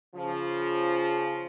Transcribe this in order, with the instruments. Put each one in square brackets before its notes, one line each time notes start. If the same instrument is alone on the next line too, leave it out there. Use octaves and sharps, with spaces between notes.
[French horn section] C#3 F3